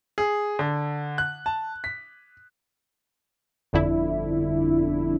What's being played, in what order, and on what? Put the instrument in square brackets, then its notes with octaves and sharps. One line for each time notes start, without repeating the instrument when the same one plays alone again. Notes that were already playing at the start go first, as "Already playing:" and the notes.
[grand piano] G#4
D3
F#6
A5
B6
[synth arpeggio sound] G1 F2 D3 D4 E4